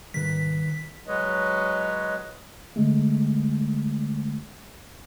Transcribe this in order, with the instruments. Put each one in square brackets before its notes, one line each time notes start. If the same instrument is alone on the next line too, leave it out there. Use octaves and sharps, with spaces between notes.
[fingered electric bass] G#2 C3 G3 [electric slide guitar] D#3 B4 [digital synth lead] B6
[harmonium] F#3 G#3 B4 C#5 D#5
[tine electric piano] D3 G#3 A3